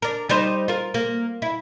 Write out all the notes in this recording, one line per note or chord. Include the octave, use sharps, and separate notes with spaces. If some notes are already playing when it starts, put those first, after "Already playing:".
D4 A#4
G3 D#4 C5
F4 A#4
A#3
E4